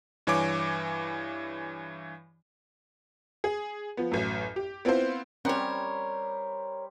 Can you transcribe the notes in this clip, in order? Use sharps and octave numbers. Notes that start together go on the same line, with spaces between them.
G2 E3 C#5 G#5 D6
G#4
F3 B3
A1 F#2
G4
B3 C4 E4 F4 C5
G3 C4 C#4 A#4 C5 C#5 F#5